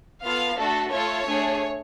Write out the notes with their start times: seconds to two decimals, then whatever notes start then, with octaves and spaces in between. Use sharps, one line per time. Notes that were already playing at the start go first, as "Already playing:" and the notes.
0.23 B3 F4 A4 F5
0.58 A3 D4 F#4 A4
0.92 A3 F4 A4 C#5
1.27 A3 D4 G#4